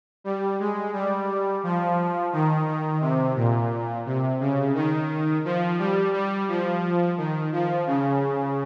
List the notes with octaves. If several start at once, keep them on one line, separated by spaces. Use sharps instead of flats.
G3
G#3
G3
F3
D#3
D#3
C3
A#2
C3
C#3
D#3
F3
G3
G3
F3
D#3
F3
C#3